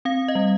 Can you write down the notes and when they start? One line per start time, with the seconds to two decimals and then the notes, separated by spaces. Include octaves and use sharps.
0.05 C4 F5
0.28 D#5
0.35 G3